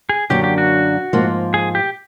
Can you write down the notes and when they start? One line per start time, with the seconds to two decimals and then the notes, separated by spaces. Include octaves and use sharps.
0.09 G#4
0.30 F#2 D3 F#3 A#3 D4 G4
0.44 G4
0.58 F#4
1.13 G#2 F3 A#3
1.54 G#4
1.75 G4